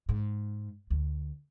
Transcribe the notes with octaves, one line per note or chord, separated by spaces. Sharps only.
G#2
D2